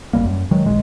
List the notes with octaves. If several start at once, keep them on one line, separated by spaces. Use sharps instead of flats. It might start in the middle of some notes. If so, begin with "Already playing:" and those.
G#1 G#2 G3 A#3
F#2
D#3 F#3 G#3
D1 A#1 G#3